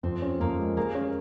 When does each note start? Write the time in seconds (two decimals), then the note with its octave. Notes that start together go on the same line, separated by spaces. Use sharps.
0.03 F2 C4
0.22 C#4
0.40 F2 A#3
0.59 G#3
0.77 A#3 G#4
0.95 C#4